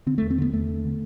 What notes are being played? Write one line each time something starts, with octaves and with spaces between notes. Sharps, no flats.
D3 C4
E2 A3
C4
D3 B3
E2 A3
D3
D3